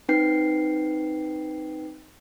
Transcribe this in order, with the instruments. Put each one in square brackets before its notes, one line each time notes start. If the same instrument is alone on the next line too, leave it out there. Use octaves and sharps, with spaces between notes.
[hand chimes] C4 D#4 B4 G5 G6 C7